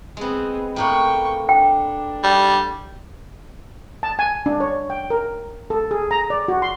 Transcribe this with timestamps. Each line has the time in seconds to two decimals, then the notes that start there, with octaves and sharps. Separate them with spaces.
0.17 G#3 B3 C4 G#4
0.76 A2 A#3 B3 G5 C#6
1.49 D4 G5
2.23 G3
4.03 A5
4.19 G#5
4.46 D4
4.60 C#5
4.90 G5
5.10 A#4
5.70 A4
5.91 G#4
6.11 A#5
6.30 D5
6.48 F#4
6.62 C6